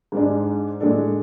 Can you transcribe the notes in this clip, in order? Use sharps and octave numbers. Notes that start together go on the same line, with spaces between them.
G#2 G#3 D4
A2 G#3 D4 A4